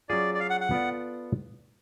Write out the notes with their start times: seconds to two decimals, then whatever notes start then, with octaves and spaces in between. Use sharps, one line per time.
0.09 F#3 C#4 F4 G#4 D5
0.35 D5
0.40 F5
0.50 F#5
0.61 F#5
0.71 B3 F4 A4 D5